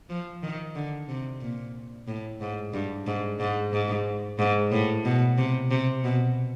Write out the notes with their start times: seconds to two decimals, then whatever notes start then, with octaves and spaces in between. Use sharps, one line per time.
0.10 F3
0.43 D#3
0.75 D3
1.08 C3
1.41 A#2
2.08 A2
2.41 G#2
2.73 G2
3.07 G#2
3.40 G#2
3.73 G#2
4.39 G#2
4.72 A2
5.05 B2
5.38 C3
5.71 C3
6.04 B2